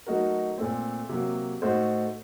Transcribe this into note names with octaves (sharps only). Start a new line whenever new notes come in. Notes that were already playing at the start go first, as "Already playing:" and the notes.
F#3 A3 D#4 F#4 A#4
A#2 A3 C4
C3 F#3 A#3
A2 A3 D#4 F#4 C5